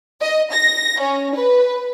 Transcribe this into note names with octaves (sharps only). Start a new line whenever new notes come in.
D#5
A#6
C#4
B4